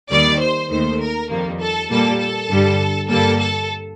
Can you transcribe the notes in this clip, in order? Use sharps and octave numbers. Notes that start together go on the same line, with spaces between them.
D#2 D#3 G3 D5
C5
D#2 D#3 A3 C5
A#4
F2 D#3 G3 A#3
A4
A#2 G3 A#3 A4
A4
G2 D3 G3
G2 D3 G3 A#3 A4
A4